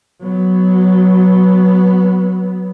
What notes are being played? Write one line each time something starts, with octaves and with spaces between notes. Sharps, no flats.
F#3 B3